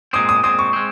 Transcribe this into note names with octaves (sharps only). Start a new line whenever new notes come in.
A#2 G#3 C4 D#6
D#6
A#2 G#3 C4 D#6
C#6
G#3 C4